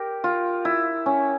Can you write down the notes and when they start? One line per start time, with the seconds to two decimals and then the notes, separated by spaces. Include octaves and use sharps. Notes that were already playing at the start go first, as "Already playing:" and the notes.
Already playing: G4 A#4
0.24 F4
0.65 E4
1.06 C#4